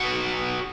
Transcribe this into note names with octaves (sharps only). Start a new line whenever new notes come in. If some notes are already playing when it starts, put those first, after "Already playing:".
Already playing: B2 F#3 B3 F#4 F#5